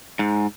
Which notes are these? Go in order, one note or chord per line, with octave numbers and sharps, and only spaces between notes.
G#2